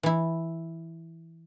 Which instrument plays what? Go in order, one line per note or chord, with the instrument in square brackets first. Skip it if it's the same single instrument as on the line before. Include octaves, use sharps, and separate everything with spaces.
[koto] E3 E4